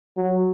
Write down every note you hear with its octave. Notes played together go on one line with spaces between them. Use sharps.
F#3